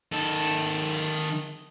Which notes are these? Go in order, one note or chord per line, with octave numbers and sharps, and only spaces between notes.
D#3 A4